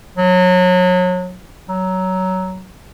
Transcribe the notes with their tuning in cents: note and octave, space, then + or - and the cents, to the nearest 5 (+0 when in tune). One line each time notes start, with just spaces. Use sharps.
F#3 -30
F#3 +15